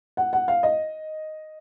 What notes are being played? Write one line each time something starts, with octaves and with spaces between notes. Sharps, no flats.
F#5
F#5
F5
D#5